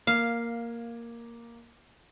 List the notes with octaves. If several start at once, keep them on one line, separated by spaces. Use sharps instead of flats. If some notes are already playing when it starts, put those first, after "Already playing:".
A#3 F5